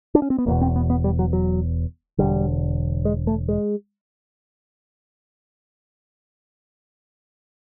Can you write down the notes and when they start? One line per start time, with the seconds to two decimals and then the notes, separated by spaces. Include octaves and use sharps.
0.15 D4
0.22 C#4
0.30 C4
0.38 B3
0.46 E1 E2 B2 A#3
0.61 C4
0.76 B3
0.90 B3
1.04 G3
1.19 F#3
1.33 F#3
2.18 E1 D#2 D3 G3
3.05 G#3
3.27 A3
3.48 G#3